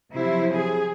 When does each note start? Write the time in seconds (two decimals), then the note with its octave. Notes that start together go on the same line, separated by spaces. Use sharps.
0.13 C3 F3 F#3 E4 C5
0.58 G#4